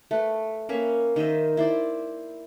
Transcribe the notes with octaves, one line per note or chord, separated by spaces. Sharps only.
A3 B4
A#3 C#4 B4 E5
D#3 C5 D#5 E5
E4 C5 D5